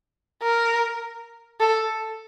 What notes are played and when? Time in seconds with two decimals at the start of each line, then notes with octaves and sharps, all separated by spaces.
0.43 A#4
1.60 A4